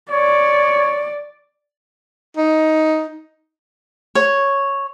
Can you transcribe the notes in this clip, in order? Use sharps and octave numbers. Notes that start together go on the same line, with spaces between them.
C#5 D5
D#4
C#5